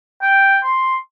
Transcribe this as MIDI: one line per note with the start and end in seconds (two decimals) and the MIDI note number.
0.22 0.57 79
0.64 0.95 84